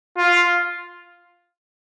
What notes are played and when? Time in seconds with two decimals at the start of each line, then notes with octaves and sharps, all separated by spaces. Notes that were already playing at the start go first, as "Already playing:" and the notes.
0.17 F4